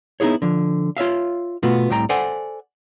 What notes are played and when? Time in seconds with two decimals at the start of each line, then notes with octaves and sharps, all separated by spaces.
0.20 B3 D#4 E4 F#4 G#4 C#5
0.42 D3 F3
0.97 F4 C#5 E5 F5
1.63 B2 A3 B3 F4 F#4
1.90 C2 A2 C3 G5 A#5
2.09 A4 C5 D5 F#5 G#5